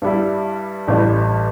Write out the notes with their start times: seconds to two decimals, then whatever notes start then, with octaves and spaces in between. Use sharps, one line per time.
0.02 G2 G3 E4
0.88 A1 G2 E3 G3